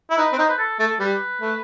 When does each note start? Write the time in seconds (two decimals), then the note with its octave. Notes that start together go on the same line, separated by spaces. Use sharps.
0.11 E4
0.18 D#4 B4
0.33 C4
0.38 D#4 C5
0.49 B4
0.59 A4
0.79 A3 A4
1.00 G3 B4
1.41 A3